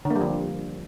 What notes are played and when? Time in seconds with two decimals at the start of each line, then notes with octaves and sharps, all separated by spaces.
0.05 D3
0.10 A#3
0.16 G3
0.21 F3